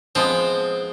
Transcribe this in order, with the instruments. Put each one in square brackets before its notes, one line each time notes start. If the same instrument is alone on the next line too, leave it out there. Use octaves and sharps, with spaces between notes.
[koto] F3 G#3 B3 [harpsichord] C4